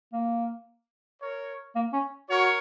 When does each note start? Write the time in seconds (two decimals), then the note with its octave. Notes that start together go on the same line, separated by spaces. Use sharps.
0.13 A#3
1.21 A#4 C#5
1.76 A#3
1.93 C#4
2.30 F#4 A#4 C#5